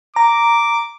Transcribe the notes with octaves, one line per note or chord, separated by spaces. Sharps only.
A#5 D6